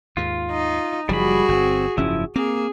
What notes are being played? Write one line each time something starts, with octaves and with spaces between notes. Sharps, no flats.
D#2 G#2 F4
D#4
F#1 F3 G3 F#4 G#4 B5
G1 C4
F#1 G#2 F3 C#4 E4
A#3 C4 G#4